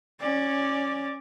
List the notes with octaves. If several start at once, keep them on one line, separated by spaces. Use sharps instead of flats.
C#4 D5